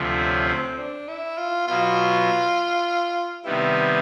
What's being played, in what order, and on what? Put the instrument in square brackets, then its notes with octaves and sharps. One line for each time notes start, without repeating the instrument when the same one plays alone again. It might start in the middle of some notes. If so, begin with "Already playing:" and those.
Already playing: [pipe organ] D2 C3 F3 A3
[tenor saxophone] C#4
C#4
C4
D4
E4
F4
[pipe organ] B2 F#3 B3 [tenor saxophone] F4
[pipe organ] C3 D#3 G3 B3 [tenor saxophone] E4